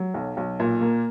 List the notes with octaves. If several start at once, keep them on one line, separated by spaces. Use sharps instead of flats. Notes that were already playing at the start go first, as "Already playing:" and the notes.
Already playing: F#3
B1
B1
A#2
A#3